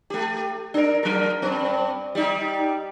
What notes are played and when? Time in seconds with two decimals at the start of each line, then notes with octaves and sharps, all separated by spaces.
0.10 A3 G4
0.74 D4 A#4
1.03 F#3 A#4
1.42 G2 C4
2.15 G3 D#4